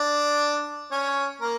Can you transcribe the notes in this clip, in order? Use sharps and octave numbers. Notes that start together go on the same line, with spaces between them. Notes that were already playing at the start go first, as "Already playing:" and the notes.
Already playing: D4 D5
C#4 C#5
A#3 A#4